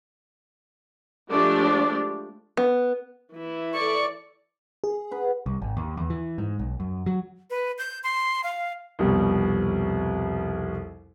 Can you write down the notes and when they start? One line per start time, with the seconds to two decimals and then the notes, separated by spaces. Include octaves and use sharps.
1.31 F3 G#3 A3 D4 G4 D5
2.57 B3
3.33 E3 E4
3.73 A4 D5 C#6
4.84 G#4
5.11 B4 F#5
5.46 C2
5.62 G#1
5.77 D#2
5.97 E2
6.10 E3
6.38 G#2
6.59 B1
6.80 F#2
7.06 F#3
7.50 B4
7.78 G6
8.04 C6
8.44 F5
8.99 C2 F2 B2 G3